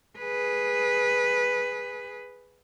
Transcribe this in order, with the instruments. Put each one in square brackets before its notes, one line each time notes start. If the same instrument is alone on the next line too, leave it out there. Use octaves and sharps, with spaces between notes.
[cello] G#4 B4